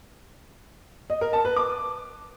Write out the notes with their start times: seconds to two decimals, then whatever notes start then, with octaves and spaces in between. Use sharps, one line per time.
1.10 D#5
1.21 A#4
1.33 A5
1.45 B4
1.56 D6